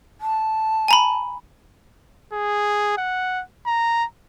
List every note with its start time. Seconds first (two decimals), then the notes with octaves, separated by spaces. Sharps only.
0.21 A5
0.88 G#5 A#5 B5
2.33 G#4
2.98 F#5
3.66 A#5